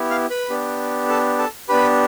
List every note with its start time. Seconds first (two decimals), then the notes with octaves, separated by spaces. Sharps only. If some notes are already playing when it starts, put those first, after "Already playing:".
Already playing: B3 E4 G4
0.10 F5 F6
0.30 B4 B5
0.50 B3 D4 G4
1.09 A4 A5
1.39 A4 A5
1.69 B3 D4 G4 B4 B5